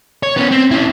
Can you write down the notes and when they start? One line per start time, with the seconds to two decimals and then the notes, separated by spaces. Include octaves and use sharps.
0.23 C#5
0.37 B3 C#4
0.51 C4
0.71 C#4 E4